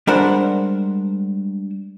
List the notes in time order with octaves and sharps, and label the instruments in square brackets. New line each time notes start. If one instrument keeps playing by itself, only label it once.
[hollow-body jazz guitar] G3 G#3 D4 A#4 C5 F#5